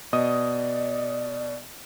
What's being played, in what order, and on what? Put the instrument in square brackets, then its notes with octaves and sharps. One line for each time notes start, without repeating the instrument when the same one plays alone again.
[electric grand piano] B2 D#5 D#6 [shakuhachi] D5